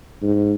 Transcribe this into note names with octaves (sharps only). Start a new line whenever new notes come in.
G#2